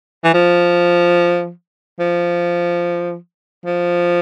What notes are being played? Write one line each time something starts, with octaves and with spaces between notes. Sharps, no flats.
E3
F3
F3
F3